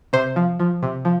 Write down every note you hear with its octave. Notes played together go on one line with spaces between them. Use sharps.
C3 C5
F3
F3
C3
F3